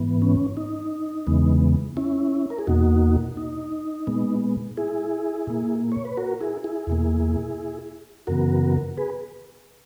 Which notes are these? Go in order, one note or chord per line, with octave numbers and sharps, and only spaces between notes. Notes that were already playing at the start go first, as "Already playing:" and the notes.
Already playing: G#2 E3 B3
C#4
D#4
E2 C#3 E3 G#3 B3
C#4 E4
A#4
G#4
E2 B2 A#3 D#4 F#4
D#4
A#2 G#3 B3
E4 G#4
A#2 A#3
C#5
B4
F#4 A#4
E4 G#4
E4 G#4
E2 B2 A#3
F#2 C#3 E3 B3 F#4 A#4
G#4 B4